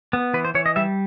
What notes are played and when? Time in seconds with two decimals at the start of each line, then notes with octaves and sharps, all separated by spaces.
0.13 B3
0.34 E3 B4
0.45 C5
0.55 E3 C#5
0.66 D#5
0.76 G3 E5